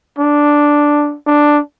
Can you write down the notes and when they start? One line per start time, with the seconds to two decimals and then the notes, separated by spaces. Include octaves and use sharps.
0.18 D4
1.27 D4